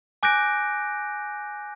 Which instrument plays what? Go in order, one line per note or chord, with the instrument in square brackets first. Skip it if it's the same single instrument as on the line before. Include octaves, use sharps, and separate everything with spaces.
[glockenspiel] G#5 D6 F#6 G6 A#6 D7